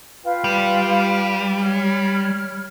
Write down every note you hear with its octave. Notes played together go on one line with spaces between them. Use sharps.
F4 B4 G5
G3
C#5 F6